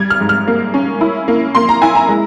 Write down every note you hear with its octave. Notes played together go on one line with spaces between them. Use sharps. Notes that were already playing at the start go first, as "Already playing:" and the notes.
Already playing: G3 G#6
F6
G#2
F6
A#3
C#4
E4
A#3
A#3 C6
A#5
E4 G#5
A#5
G#3